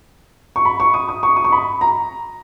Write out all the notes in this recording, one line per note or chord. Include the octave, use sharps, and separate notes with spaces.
C#6
B5
C#6
D#6
D#6
C#6
D#6
C#6
B5
A#5